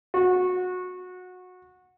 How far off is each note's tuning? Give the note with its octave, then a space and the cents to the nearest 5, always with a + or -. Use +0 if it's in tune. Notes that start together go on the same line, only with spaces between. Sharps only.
F#4 -20